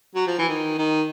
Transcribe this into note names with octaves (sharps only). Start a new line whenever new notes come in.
F#3
F3
E3
D#3
D#3